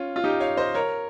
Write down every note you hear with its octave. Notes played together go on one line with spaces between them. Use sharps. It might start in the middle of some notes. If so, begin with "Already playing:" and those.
Already playing: C#4 F4
F4
D#4 G4
C#5 F5
C5 D#5
A#4 C#5